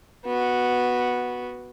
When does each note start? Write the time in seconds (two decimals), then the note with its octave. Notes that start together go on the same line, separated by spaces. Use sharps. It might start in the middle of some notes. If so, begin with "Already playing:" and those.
0.25 B3 F#4